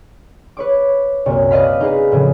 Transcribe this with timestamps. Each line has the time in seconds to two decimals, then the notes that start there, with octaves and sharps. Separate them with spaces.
0.57 B4 C#5 D6
1.26 C2 F#2 A#2 C#5
1.51 B4 D5 D#5 F5 B5
1.81 D#4 G#4 B4 F5
2.12 A2 C#3 F3